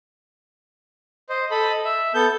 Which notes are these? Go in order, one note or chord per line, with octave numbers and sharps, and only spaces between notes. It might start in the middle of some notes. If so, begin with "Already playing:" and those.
C5 D#5
A4 D#5 B5
E5
B3 A4 G6